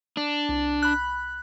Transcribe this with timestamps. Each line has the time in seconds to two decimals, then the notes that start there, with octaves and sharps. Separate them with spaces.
0.17 D4
0.49 C2
0.82 B5 F#6